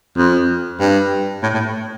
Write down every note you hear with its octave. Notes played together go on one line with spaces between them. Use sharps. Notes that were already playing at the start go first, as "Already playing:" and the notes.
F2
G2
A2
A2